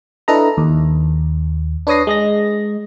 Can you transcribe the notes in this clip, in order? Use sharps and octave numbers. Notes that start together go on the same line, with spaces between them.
D4 E4 A4 B4 D#5 A#5
D#2
D4 B4 C#5 D#6 A#6 C7
G#3 D#5 A#6